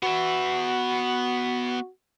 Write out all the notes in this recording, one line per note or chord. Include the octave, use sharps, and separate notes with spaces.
B3 F#4 E5